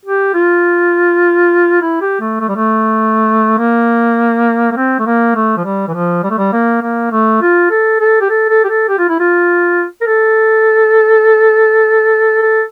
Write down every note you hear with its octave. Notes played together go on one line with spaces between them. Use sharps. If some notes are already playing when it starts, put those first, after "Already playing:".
G4
F4
E4
G4
A3
A3
G3
A3
A#3
A#3
C4
A3
A#3
A3
F3
G3
E3
F3
G3
A3
G3
A#3
A#3
A3
F4
A4
A4
G4
A4
A4
G4
A4
G4
F4
E4
F4
A#4
A4
A4